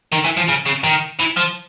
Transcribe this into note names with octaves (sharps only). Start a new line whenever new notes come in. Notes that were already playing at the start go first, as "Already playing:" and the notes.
D#3
E3
F3
C#3
C#3
D#3
E3
F3